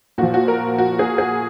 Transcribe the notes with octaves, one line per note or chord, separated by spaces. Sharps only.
A#2 F3 F#4
F#4
A#4
F#4
G#4
G#4